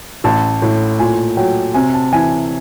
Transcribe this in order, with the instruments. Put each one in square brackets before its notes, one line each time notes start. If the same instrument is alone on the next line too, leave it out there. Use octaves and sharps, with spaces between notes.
[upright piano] A1 [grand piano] A5
[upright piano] A2
[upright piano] A#2 [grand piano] G#5
[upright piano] F#3 [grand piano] G5
[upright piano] C3 [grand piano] G#5
[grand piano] A5
[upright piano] E3 [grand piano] G#5